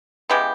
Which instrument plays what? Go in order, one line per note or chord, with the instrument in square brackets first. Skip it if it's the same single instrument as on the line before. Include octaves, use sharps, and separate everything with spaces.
[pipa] C#3 E3 G#3 B3 G4